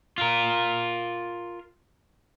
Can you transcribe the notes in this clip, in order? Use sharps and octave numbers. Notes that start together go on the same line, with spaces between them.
F4 A#4